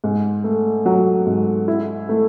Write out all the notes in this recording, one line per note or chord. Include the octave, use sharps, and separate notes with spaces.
G#2
A3
F#3
G#2
E4
A3